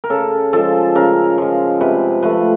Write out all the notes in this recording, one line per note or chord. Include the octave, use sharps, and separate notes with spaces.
A#4
C#3 A4
F3 G#3 A4
C#3 A#4
F3 G#3
C3 B4
F3 A3 B4